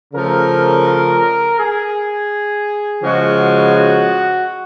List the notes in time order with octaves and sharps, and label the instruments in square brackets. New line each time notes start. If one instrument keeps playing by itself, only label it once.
[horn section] C#3 F3 A3 A#4
A#4
G#4
C#3 F3 G#3 F#4
F#4
F#4